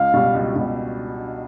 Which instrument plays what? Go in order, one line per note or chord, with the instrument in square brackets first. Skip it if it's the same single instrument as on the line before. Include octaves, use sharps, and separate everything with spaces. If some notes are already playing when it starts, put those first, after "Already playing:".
Already playing: [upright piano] C#2 [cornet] F5
[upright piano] B2 G3
C#2
B2 G3